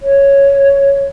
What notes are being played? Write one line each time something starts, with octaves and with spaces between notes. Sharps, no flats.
C#5